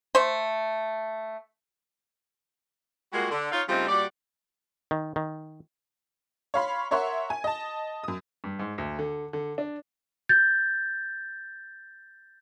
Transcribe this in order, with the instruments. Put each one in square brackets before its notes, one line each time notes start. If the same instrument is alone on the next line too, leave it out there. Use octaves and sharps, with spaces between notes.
[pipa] A3 C5
[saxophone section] G3 G#3 A#3 F4 F#4
D3
D#4 F4 C#5 F5
C#3 G3 A3 C4 D#4 F4
A#2 G3 F#4 D5
[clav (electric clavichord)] D#3
D#3
[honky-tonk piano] C#5 F5 B5 C6
A#4 C#5 E5 F#5 C6 C#6
G#5
D#5 A5
F#2 D#6
[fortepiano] G2
G#2
D2
D3
D3
D4
[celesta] G6 A6